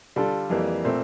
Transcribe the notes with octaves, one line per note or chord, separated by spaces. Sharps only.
D3 G3 D4 F4 A4
F2 E3 G3 A#3
A#2 A3 C4